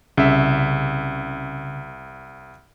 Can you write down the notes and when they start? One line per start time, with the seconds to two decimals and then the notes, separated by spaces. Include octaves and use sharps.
0.17 C2 C#3 E5